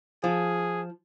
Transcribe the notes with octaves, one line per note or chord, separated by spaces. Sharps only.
F3 G#4